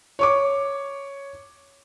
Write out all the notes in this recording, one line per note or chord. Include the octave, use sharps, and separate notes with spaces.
C#5 C#6 D6